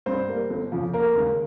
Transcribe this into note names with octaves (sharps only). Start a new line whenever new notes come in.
G2 C4 C5
G3 A#3
G1
F2 C#3 F3
F1 A#3 A#4
D#2 C#3 G#3